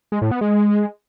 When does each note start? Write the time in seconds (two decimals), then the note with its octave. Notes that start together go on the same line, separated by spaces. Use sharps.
0.12 G#3
0.22 A2
0.31 B3
0.41 G#3